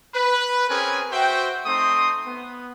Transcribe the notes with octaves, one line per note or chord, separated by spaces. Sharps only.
B4
C4 C#4 G#4 A#4 B4 G#5
F#4 C5 E5 G5
A3 C4 D#4 C6 D#6
B3